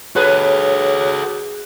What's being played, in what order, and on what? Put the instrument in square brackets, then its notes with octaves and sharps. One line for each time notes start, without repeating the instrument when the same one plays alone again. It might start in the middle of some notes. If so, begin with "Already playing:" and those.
[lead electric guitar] F#4 A4 [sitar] G#4 B4 [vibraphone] C#5 [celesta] F#6